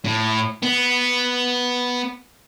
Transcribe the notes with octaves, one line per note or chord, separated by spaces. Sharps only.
A2
B3